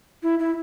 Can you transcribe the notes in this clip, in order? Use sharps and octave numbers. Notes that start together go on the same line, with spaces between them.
E4
E4